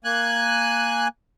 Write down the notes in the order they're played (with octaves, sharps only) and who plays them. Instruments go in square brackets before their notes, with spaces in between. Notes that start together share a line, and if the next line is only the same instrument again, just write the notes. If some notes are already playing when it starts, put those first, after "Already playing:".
[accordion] A#3 G#5 F#6